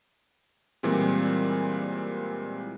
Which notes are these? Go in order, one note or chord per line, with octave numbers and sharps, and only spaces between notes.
A#2 E3 G3 G#3 C4